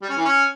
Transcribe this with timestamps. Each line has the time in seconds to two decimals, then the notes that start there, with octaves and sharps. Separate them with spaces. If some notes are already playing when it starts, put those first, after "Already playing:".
0.02 G3
0.09 C#4
0.17 E3
0.25 C#4